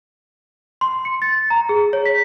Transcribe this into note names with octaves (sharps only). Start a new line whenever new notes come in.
C6
C#7
A6
A#5
G#4
C#5
B6